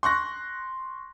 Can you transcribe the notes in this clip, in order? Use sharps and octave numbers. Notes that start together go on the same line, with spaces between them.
C6 C#6 F#6 A#6